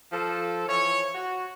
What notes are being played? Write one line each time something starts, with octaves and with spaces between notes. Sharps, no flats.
F3 A4
E3 F3 C#5
F#4